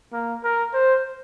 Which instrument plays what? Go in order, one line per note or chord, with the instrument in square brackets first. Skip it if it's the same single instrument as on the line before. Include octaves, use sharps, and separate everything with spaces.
[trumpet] A#3
A#4
C5